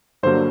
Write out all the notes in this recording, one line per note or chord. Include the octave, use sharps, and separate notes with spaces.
G2 D3 F#3 A#3 C5